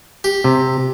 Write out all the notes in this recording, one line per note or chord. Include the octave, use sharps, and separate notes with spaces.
G4
C3